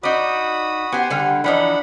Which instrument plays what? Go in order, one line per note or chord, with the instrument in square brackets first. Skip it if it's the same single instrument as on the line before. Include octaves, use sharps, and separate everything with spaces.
[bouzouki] D#4 D5 [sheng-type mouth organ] F#4 B5 D#6
[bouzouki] B3 C5 [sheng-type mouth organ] G4 G#5
[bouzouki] D3 G3
[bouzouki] E3 F3 D#4 [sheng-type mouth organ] D4 F#5 B5